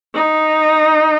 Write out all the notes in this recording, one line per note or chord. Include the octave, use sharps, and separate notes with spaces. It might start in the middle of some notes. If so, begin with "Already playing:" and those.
D#4